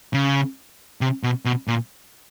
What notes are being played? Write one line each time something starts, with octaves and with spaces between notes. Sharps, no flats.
C#3
C3
B2
B2
A#2